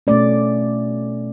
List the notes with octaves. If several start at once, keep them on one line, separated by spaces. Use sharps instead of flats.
B2 A3 C#4 D5